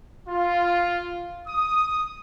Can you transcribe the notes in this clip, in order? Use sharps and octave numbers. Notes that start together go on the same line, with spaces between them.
F4
D#6